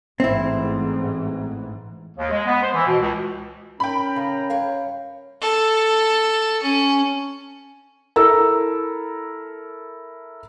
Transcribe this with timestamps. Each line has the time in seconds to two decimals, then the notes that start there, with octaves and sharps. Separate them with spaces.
0.20 A1 G#2 E3 C4 E4
2.17 D#2
2.31 G#3
2.46 B3
2.63 C5
2.74 E3
2.87 B2
3.00 C#2
3.80 C#4 A#4 G5 A#5 B5
4.16 C#3 D#5
4.50 G2 C#5 F5
5.41 A4
6.63 C#4
8.16 E4 A4 A#4 A#5 E6